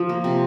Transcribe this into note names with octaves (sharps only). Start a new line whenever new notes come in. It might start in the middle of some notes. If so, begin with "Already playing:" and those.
Already playing: F3
A#3
C3